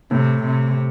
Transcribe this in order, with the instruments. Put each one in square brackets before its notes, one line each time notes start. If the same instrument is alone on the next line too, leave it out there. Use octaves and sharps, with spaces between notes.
[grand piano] A2 [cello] C3
[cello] C3